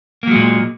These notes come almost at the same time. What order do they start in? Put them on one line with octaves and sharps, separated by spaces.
A#3 F#3 G#3 A#2